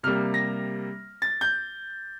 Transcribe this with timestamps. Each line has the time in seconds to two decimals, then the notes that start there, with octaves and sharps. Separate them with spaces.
0.03 C3 G3 A#3 F6
0.34 A#6
1.22 A6
1.41 G6